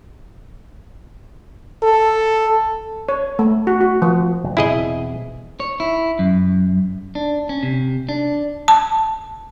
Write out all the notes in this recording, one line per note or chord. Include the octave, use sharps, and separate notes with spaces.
A4
C#5
A3
F#4
F#4
F3
F#1
E2 B2 C4 E4 G#4 D#5
C#5
E4
F#2
D4
C#4
C3
D4
A5